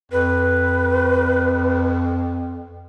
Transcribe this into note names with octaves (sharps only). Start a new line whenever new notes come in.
F2 B4